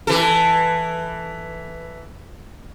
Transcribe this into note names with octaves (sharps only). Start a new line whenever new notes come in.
E3 A4